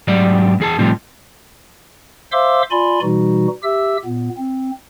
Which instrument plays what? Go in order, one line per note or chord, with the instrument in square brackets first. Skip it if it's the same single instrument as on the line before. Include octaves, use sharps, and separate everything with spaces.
[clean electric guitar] G#2 F#3 G4 D5
E2 G#4 A5
A2 C3 F3 G3
[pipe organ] C5 E5 F5 C6 D6 E6
F4 D5 G#5 B5 C6
B2 E3 G3 D#4 F#4
G4 E5 E6
A#2 B3
C4